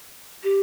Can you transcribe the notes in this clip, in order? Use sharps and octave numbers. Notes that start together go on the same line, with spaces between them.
G4